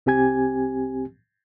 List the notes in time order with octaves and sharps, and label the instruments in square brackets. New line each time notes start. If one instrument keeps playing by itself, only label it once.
[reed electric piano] C2 C4 G4 G#5 G#6